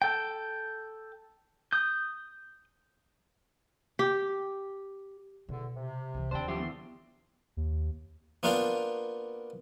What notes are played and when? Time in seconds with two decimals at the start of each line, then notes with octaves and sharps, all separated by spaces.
0.02 A4 G5
1.73 D#6 G6
3.99 G4
5.49 E2 B2 D3
5.77 C3
6.14 C2 E3
6.31 D#2 D3 G3 D4 C5 G5
6.48 F#2 F3 A3 G4 C6
6.59 E2
7.57 D#2
8.43 A#3 B3 D4 F4 F5 G5